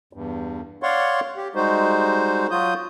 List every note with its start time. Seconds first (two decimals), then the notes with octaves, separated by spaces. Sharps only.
0.13 E2 G2
0.83 C#5 D5 F5 F#5 C6 C#6
1.37 G4
1.55 G3 G#3 D#4 F#4 C5
2.51 F#3 F4 F#4 D#6 G6